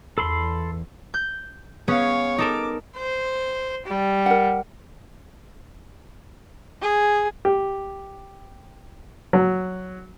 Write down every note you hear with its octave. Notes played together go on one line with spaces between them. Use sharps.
E2 A4 B5 C6
G6
B3 C#4 G#4 C#5 F5
D#4 A4 A#4 D6
C5
G3
A#4 F#5
G#4
G4
F#3